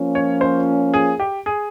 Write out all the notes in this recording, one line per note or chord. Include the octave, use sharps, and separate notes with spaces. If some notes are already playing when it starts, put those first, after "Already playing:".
Already playing: F3 A#3 C#4 F4
C#5
C5
G#4
G4
G#4